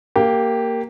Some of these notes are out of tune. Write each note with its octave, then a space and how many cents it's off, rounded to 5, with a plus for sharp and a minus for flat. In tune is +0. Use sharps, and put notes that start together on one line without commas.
A#3 -10 G4 +0